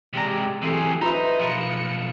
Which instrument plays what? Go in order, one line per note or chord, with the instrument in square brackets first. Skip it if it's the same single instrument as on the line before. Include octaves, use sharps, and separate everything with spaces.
[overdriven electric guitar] C3 G#3 [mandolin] G4 D5 A#5
[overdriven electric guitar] E3 F#3 [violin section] A3 G4 C7 [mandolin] C4 D#4 G#4
[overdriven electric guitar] D#4 [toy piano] F4 A#5 [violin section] B4 [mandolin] C5 E5
[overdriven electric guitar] B1 F3 [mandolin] A#4 B4 [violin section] C#7